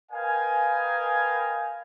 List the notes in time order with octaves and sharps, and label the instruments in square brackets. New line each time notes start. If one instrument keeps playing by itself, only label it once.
[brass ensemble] A#4 B4 D#5 F5 G5 G#5